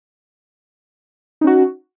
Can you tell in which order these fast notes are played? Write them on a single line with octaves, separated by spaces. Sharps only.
D#4 C#4 F#4